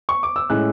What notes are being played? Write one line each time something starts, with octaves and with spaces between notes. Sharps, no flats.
C#6
D6
E6
A2 G#3 C#4 F#6